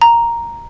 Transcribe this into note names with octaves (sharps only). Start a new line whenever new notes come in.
A#5